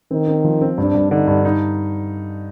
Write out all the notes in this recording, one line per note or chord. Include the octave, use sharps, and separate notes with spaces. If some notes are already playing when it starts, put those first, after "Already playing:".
D#3 C4
C4
F3
C4
G2 D4
G2
D3 D#4
G2
D#4